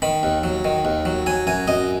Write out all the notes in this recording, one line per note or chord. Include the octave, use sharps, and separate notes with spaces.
D#3 B5
D#2
F#3
D#3
D#2
F#3
F#3 G#5
F#2 G#5
F#2 D#5